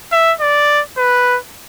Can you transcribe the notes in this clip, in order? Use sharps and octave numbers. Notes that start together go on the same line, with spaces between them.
E5
D5
B4